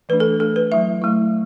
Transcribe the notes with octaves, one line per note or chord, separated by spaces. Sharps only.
E3 A3 D4 B4
A4
E3 A3 D4 A4
B4
F#3 A3 E4 E5
F#3 A3 E4